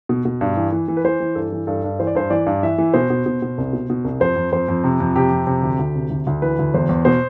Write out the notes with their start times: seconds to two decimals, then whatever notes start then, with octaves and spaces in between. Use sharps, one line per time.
0.09 B2
0.25 B2
0.41 G2
0.57 E3
0.72 E3
0.88 E3
0.97 B4
1.04 E3 C5
1.20 E3
1.35 G2 A4
1.52 E3
1.67 G2 A4
1.84 G2
2.00 E3 C5
2.07 D5
2.15 G2 C5
2.30 E3 D5
2.46 G2
2.63 E3 E5
2.78 E3
2.94 B2 C5
3.10 B2
3.26 B2
3.42 B2
3.58 C2
3.73 B2
3.90 B2
4.04 C2
4.20 F2 C5
4.36 F2
4.52 F2 C5
4.68 F2
4.84 C3
5.00 F2
5.16 C3 G4
5.31 F2
5.47 C3
5.63 D2
5.79 D2
5.95 C3
6.10 D2
6.27 D2
6.42 E3 B4
6.59 D2
6.74 E2 C5
6.89 E2
7.05 B2 C5